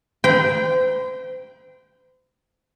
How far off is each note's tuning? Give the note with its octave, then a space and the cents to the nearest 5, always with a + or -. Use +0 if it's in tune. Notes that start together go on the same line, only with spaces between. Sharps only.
C5 -35 G5 -5 B5 -45